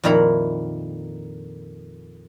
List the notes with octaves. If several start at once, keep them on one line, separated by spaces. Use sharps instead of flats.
F2 A#2 D#3 E4 A#5 B5